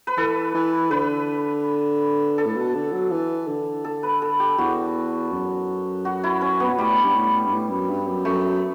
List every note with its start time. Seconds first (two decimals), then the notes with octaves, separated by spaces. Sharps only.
0.07 B4
0.17 E3 A4
0.54 E3
0.91 D3 B4
2.38 A4
2.46 A2
2.56 B2
2.75 D3
2.92 F#3
3.11 E3
3.48 D3
3.84 A4
4.03 B4
4.22 A4
4.40 G4
4.58 E2 F#4
5.32 F#2
6.05 F#4
6.24 E4
6.41 C#4
6.60 B3
6.69 B2
6.78 A2 G3
7.03 G2
7.15 A2
7.45 G2
7.52 A2
7.70 F#2
7.89 G2
8.07 F#2
8.25 F#2 A3